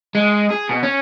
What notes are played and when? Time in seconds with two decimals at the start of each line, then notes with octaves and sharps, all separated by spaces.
0.15 G#3
0.51 G#4
0.69 B2
0.83 C#4